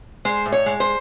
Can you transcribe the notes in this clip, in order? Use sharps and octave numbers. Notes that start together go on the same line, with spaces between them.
G#3 C5
A2
C#5
G#3
C5